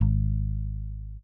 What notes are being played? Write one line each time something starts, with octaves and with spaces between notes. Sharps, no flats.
G#1